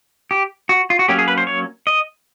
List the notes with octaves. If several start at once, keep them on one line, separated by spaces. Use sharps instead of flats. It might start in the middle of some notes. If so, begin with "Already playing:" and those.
G4
F#4
F4
F#4
F#3 A#3 C#4 G4
G#4
B4
C5
C#5
D#5